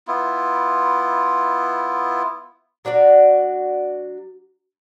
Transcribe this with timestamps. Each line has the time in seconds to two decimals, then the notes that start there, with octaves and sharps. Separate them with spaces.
0.07 B3 E4 F4
2.85 F#3 D4 F#4 D5